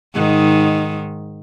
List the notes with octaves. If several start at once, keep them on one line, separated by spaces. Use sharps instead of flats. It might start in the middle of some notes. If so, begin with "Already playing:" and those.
G#2 D#3